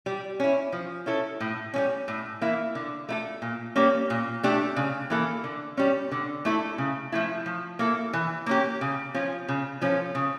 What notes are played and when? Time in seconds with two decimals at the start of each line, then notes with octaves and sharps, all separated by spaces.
0.06 G3
0.40 C#4 E4
0.72 F3
1.06 C#4 E4 A4
1.41 A2
1.74 G3 A#3 C#4
2.08 A2
2.41 E3 A#3 E4
2.75 D3
3.09 A3 E4 A4
3.42 A#2
3.76 G3 A#3 C#4
4.10 A#2
4.43 A3 D4 G4
4.76 C#3
5.10 E3 A#3 E4 A4
5.44 D3
5.77 G3 C#4
6.12 D3
6.45 A3 E4 A4
6.78 C#3
7.12 F3 A3 E4
7.46 F3
7.79 A#3 E4 A4
8.13 E3
8.46 A#3 C#4 G4
8.81 C#3
9.14 F3 C#4 F4
9.48 C#3
9.81 F3 C#4 F4 A4
10.15 C#3